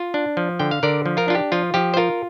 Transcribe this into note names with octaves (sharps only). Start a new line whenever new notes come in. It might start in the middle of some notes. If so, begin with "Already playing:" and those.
Already playing: F4
D4
F3
D3 G5
F5
D3 A#4 D5
F3
F4 A#4
D4 F4
G4
F3 F4
F3 G4
C5
F4 A#4